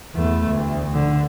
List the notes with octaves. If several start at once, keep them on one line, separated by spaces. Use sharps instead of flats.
E2 A3
D2
D3